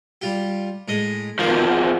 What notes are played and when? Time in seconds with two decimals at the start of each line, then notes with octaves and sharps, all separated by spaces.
0.22 G3 F4 G4
0.88 A2 G#3 D#5
1.39 E2 B2 D#3 F3 A#3 D6
1.69 G#4 C5 F#5